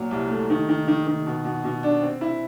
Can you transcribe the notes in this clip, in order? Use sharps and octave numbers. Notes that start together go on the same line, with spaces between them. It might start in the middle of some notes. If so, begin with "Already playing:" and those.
Already playing: A#2 F#3
C2
A3
D#3
D#3
D#3
D#3
B2
B2
B2
D4
C4
E4